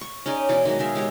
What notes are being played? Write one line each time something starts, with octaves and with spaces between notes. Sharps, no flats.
C#6
C#4 D#4 G#4 D5
B2 E3 D5
D#3 F#3 G#3
D#3 G#4 E5 F5
G#3 G4 C#5